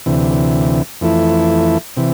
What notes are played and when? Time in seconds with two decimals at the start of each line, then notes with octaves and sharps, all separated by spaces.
0.06 D2 C3 E3
1.01 F2 E3 A3 E4
1.97 C3 E3